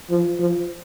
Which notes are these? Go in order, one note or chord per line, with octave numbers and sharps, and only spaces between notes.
F3
F3